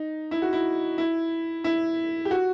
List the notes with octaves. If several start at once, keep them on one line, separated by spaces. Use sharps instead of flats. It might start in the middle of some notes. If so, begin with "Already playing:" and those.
Already playing: D#4
E4
F#4
E4
E4
E4
G4
F#4